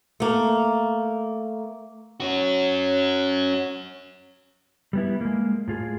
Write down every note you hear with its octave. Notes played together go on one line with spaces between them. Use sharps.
A3 A#3
C#4 F#4
G3 B3 E4
G#3 A#3
A2 F4 G#4